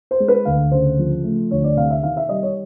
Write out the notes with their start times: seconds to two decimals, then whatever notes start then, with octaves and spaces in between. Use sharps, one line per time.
0.11 C5
0.20 G#3
0.28 B4
0.45 D2 F5
0.71 C#3 C5
0.99 F3
1.24 A3
1.51 D2 C#5
1.64 D5
1.76 C3 F5
1.90 E5
2.03 D#3 F5
2.17 E5
2.29 G3 D#5
2.43 C#5